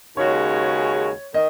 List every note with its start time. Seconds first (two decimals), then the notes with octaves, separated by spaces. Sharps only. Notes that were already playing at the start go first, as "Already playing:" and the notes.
0.17 D#2 C#3 G#3 C#4 F#4 C#5
1.34 D#3 D#5